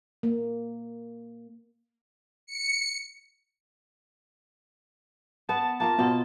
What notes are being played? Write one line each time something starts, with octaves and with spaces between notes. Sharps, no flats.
A#3
C#7
B3 A5
A#3 F4 A#4 A5
B2 B3 F4 F#5